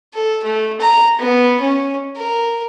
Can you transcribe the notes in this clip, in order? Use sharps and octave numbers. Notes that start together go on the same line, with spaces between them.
A4
A3
A#5
B3
C#4
A#4